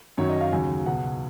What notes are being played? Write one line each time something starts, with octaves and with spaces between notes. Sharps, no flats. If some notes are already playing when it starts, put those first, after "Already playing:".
F#2 D#3 F#3 C#5
D#5
F5
D#2 C#3 F#3 G#5
C#2 B2 F#3 F#5